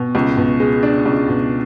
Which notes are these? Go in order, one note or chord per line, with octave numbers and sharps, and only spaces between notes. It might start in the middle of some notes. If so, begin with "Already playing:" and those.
Already playing: B2
C#2
B2
G#3
D4
C#2
B2